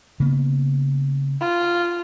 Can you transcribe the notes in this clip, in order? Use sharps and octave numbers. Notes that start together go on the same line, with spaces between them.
C#3 A#3 B3
F4